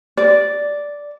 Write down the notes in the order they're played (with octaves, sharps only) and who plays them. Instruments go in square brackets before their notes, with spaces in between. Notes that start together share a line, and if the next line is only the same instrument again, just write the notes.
[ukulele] D5